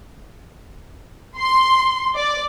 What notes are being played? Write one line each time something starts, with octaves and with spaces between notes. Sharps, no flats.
C6
D5